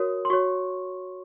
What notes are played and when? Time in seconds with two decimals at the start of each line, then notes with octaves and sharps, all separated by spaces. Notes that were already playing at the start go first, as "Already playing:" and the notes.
Already playing: F#4 A#4 C#5 D#6
0.25 C6
0.30 F#4 C#5 C#6